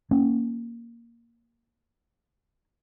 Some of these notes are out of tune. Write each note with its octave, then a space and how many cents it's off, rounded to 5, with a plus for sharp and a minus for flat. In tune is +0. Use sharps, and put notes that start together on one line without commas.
A#3 +0 C#4 +0